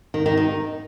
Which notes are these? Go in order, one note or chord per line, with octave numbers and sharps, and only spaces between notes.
D#3
D#3
D#4